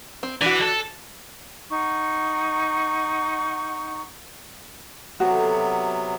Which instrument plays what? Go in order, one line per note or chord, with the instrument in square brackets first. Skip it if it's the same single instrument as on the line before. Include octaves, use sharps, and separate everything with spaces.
[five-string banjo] C4
[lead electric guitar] E3 [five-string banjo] D4 F#4
[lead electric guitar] A4
[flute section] D#4 F#5 C#6
[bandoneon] C3 F#3 B3 [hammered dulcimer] E4 A4 [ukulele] F#4